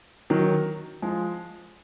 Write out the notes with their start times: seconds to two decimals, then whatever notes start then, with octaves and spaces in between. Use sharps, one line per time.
0.30 D#3 F#3
1.02 F3 G#3